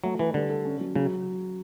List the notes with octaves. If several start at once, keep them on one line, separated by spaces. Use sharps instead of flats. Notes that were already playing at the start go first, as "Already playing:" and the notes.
F#3 A3
E3 B4
D3 G3
A4
C#4
F#3
C#3 F#3